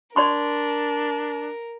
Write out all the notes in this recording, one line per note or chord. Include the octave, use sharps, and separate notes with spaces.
D4 A#4 D5 C6 C#6